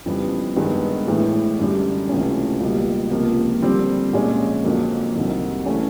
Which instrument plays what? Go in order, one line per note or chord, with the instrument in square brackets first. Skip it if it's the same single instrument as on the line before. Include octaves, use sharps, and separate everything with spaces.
[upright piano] F2 C#3 E3 G3 B3
G2 D#3 G#3 B3
A2 E3 G#3
F#2 D3 G3
C#2 C3 E3 A3 C#4
C#2 B2 G3 A#3
C#2 C3 F3 A#3
D3 G3 C4
A#2 F3 G#3 C#4
F2 D3 F#3 A#3
C2 C3 D#3 F#3
C#3 E3 A3 C#4